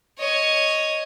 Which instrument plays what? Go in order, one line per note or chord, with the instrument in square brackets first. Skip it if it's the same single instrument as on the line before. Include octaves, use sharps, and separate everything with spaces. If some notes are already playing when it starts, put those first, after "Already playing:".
[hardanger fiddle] C#5 D#5